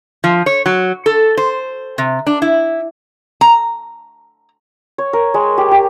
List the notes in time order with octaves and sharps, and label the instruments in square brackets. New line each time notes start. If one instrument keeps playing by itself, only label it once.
[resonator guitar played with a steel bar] F3
C#5
F#3
A4
C5
C3
D4
E4
A#5
[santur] C#5
A#4
G#3
G4
G4